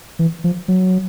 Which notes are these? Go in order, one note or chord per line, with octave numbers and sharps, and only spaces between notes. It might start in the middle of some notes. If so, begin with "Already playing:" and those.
E3
F3
F#3